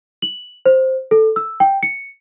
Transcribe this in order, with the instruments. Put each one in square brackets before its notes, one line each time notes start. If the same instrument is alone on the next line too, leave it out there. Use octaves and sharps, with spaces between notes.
[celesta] F#7
C5
A4
E6
G5
C#7